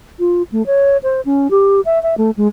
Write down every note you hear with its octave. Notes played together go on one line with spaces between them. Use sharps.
F4
A3
C#5
C5
C#4
G4
E5
E5
A3
G#3